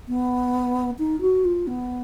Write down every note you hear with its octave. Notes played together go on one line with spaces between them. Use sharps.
B3
D#4
F#4
F4
B3